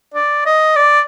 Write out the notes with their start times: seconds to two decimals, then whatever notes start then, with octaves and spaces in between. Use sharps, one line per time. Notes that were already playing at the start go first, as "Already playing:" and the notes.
0.14 D5
0.46 D#5
0.76 D5